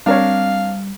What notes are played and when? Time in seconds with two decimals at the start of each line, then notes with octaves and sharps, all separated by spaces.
0.06 G3 C4 D4 A#4 C#5 F5